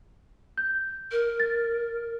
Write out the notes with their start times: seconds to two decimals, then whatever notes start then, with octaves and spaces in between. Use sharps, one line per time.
0.58 G6
1.11 A#4
1.40 A6